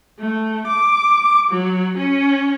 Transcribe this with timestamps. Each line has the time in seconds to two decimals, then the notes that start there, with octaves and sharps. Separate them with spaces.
0.19 A3
0.68 D6
1.51 F#3
1.97 C#4